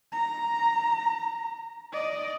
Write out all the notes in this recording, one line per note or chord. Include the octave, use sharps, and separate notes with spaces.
A#5
D5 D#5